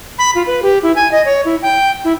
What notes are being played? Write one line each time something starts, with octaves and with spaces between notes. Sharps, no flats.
B5
F4
B4
G4
E4
G#5
D#5
C#5
E4
G5
E4